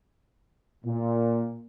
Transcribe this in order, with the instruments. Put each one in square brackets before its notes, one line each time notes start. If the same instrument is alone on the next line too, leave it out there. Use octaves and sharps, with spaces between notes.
[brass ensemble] A#2